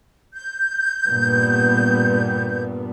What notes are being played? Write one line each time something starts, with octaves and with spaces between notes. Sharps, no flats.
G6
G2 A#2 B3